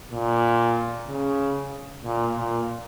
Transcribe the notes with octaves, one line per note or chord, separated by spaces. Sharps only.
A#2
C#3
A#2
A#2